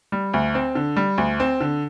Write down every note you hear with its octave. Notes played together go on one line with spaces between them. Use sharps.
G3
D2
C4
D3
G3
D2
C4
D3